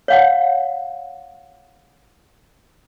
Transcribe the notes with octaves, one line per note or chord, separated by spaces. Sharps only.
C#5 F5 F#5